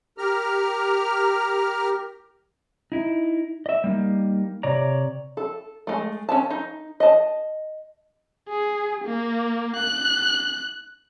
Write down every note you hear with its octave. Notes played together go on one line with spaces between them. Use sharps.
G4 A#4 A#5 F6
D#4 E4
D#5 E5
G3 A#3 D#4
C3 C#5 D5 A#5
A4
G#3 A3
C#4 F4 A5
D#4
D#5 A5
G#4
A#3
F#6